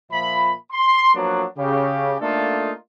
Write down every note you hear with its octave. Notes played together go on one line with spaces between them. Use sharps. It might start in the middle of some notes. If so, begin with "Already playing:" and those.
A#2 F3 E5 B5
C6
F3 F#3 A#3 B3 D4
C#3 G4
A3 A#3 D4 D#4 F4 A4